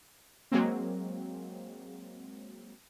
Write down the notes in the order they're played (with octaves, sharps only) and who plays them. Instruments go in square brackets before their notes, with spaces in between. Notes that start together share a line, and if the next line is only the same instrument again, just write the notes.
[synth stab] F#3 G#3 A#3 C4